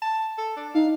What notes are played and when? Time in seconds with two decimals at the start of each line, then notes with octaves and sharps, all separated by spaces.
0.02 A5
0.38 A4
0.56 D4
0.75 D#4 F5